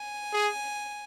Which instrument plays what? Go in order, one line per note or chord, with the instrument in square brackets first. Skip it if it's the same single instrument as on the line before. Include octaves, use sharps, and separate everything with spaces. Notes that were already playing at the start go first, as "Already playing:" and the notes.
Already playing: [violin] G#5
[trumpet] G#4